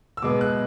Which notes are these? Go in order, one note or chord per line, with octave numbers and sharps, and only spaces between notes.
E6
B2 G#3 B3 D6
F#6